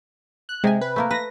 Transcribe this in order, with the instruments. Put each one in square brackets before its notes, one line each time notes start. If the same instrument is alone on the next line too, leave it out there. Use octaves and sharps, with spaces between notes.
[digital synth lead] F#6
[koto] C3 G#5 [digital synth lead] G#3
[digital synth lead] B4
[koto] A3 A#3 A#4
[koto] B4 [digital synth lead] A#6